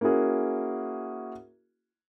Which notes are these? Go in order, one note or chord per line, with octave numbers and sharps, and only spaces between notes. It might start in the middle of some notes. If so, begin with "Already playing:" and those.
A#3 C#4 E4 F#4 G#4